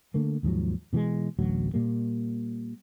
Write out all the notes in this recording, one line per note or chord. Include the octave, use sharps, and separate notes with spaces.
D3 A3 A#3
D#2 G#2 F3 F#3
B2 E3 F#3 G#3
D1 A1 D2 F#3
A#2 G3 A#3